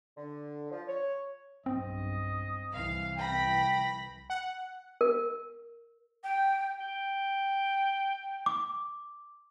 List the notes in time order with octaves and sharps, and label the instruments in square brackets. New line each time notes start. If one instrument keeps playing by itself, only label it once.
[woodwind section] D3
F3
C#5
[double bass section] B1 G2 [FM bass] C4 [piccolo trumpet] D#5
[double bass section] C2 E3 [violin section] F5
[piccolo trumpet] G5 [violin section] B5 A#6
[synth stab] F#5
[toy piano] A#4
[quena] G5
[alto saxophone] G5
[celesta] D6